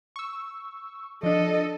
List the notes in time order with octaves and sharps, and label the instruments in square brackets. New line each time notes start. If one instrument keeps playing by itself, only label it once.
[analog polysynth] C#6 E6
[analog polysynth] F3 D4 [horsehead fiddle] A4 D#5